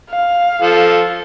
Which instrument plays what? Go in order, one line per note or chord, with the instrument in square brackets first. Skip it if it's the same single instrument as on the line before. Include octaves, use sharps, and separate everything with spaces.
[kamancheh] F5
[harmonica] F3 A4